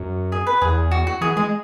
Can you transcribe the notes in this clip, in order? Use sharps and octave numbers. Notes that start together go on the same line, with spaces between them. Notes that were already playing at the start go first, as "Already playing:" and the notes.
Already playing: F#2 F#4
G#4
B4
E2 G#4
F#4
F#4
E3 G#4
G#3 G#4